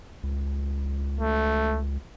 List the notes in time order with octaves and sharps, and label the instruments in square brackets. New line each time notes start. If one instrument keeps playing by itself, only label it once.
[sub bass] C#2
[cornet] A3